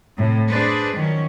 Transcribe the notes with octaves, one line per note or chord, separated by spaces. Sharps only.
A2 C3
D4 G#4 B4 C5 D5
D#3 F3 F#3 C#4